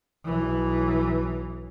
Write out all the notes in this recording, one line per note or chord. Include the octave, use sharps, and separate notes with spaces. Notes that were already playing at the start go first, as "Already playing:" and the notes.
B1 E3